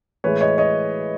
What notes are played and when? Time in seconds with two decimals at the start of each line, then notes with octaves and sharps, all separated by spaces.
0.24 A2 E3 G#3 B4 C#5
0.41 C#5 D#5
0.58 C#5 D#5